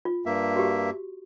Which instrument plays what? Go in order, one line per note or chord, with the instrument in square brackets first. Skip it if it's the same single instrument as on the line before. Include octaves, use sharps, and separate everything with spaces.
[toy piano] F4
[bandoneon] G2 A#3 E5
[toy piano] F#4 G4